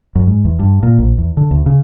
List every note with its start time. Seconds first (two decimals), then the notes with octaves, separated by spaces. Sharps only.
0.15 F#2
0.27 G#2
0.45 E2
0.59 G2
0.83 A#2
0.98 A#1
1.18 E2
1.37 D3
1.51 D2
1.66 C#3